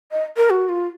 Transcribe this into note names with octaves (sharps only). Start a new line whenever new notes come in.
D#5
A#4
F#4
F4